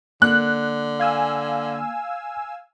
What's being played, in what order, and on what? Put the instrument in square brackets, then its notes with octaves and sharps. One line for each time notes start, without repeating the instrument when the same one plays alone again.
[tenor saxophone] D3 [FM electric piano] A#3 [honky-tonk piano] F#6
[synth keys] F5 G#5 E6